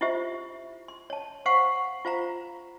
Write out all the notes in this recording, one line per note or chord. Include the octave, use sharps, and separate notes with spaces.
E4 F4 G4 C5 E5
C6
C#5 A5
C5 F5 F#5 C#6
F4 C5 F5 A#5